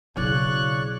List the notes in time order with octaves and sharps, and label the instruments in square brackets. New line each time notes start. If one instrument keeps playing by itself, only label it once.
[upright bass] B1 E4 [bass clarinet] C#3 [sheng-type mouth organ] C#5 D5 C#6 [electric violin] F#6